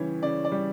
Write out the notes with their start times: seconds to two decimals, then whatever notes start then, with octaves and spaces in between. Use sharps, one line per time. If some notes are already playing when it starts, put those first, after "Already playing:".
Already playing: C#3 E3 G3 C#5
0.22 C#3 D5
0.45 D5
0.52 G3